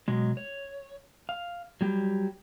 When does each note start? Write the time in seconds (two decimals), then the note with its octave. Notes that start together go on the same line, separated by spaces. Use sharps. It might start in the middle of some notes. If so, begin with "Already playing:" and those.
0.08 B2 F#3 G#3
0.37 C#5
1.29 F5
1.81 F#3 G3 G4